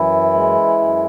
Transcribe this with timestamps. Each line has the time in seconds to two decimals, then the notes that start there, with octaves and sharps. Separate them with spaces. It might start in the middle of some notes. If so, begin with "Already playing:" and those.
Already playing: F#2 E3 E4
0.34 G#3
0.79 F#2